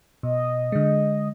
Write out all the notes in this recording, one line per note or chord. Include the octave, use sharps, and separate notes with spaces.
B2 D#5
D3 G#3